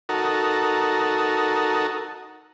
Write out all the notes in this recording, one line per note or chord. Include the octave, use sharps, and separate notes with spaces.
D#4 F#4 A4 A#4